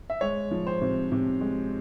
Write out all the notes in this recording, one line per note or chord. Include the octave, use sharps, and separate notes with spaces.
E5
G#3 C#5
F3
C5
C3
C3
G#3